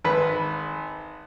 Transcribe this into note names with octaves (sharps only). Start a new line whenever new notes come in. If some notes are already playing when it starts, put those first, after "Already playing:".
G#1 B4 B5